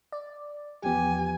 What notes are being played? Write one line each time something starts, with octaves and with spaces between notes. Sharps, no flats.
D5
E2 F3 B3 G4 G#5